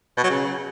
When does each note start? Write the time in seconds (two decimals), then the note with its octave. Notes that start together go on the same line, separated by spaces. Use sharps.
0.17 B2
0.24 F#3
0.30 C#3